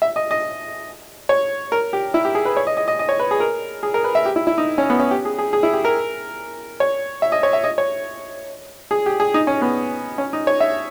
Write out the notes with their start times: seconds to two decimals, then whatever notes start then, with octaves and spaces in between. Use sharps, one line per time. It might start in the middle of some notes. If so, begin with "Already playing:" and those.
0.02 E5
0.16 D#5
0.31 D#5
1.29 C#5
1.72 A#4
1.93 G4
2.14 E4
2.25 G4
2.35 G#4
2.45 B4
2.57 C#5
2.67 D#5
2.77 D#5
2.88 D#5
2.99 D#5
3.09 C#5
3.20 B4
3.31 G#4
3.40 A#4
3.83 G#4
3.94 A#4
4.04 B4
4.15 E5
4.25 G4
4.36 E4
4.47 E4
4.58 D#4
4.78 C#4
4.90 B3
5.00 C#4
5.11 G4
5.25 G#4
5.38 G#4
5.53 G#4
5.63 E4
5.73 G4
5.85 A#4
6.80 C#5
7.22 E5
7.32 D#5
7.43 C#5
7.53 E5
7.64 D#5
7.78 C#5
8.91 G#4
9.06 G4
9.20 G#4
9.34 D#4
9.47 C#4
9.62 B3
10.18 C#4
10.33 D#4
10.47 C#5
10.60 E5